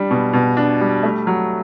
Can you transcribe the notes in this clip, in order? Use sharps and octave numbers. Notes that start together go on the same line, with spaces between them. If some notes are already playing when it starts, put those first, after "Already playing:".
Already playing: G3 D4
B2
B2
D4
G3
A3
F#3